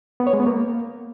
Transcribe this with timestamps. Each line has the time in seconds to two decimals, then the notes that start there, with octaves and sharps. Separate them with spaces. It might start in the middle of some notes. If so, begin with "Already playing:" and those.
0.20 B3
0.27 C#5
0.33 G#3
0.40 B3
0.47 A#3